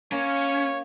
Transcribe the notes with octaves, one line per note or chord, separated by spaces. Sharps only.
A#3 C#4 C#5